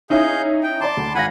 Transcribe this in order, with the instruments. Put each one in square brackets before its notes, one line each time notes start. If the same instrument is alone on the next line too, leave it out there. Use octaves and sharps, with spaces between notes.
[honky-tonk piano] C#4 D#4 E4 [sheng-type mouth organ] G#4 F5 G6
[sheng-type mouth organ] G5
[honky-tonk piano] D5 A#5 [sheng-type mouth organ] A5 C6 D6
[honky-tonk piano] D2
[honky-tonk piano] G#1 F5 A#6 [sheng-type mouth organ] F#5 G#5 B5